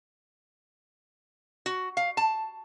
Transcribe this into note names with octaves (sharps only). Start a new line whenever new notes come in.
F#4
F5
A5